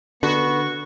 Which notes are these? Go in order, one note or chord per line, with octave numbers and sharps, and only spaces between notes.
D3 B3 F#4 C#6